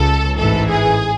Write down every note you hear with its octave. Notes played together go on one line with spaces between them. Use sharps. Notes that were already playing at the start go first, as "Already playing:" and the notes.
Already playing: C#2 C#3 A4
A1 G#2 E3 A4
G#4